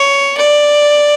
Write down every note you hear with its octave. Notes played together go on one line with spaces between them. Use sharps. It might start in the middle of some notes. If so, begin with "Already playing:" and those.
Already playing: C#5
D5